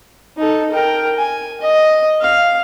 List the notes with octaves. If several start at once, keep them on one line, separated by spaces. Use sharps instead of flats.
D#4 A4
A#4 G5
G#5
D#5
F5